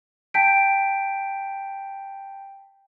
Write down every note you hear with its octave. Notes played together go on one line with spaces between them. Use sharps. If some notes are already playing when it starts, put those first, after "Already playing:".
G5 A5 G6 B6 D7